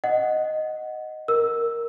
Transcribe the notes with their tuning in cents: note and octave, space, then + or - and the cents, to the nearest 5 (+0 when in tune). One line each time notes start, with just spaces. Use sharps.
D#5 +0 F#5 +0
A#4 +0 E6 +0